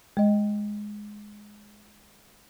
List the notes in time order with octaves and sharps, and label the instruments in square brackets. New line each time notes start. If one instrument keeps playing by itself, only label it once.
[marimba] G#3 D#5